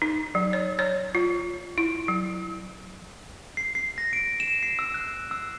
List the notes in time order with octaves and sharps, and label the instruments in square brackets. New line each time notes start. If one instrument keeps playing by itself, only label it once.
[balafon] D#4
F#3
C#5
C#5
F4
E4
F#3
[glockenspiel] C7
C7
A#6
D7
E7
C7
E6
F#6
E6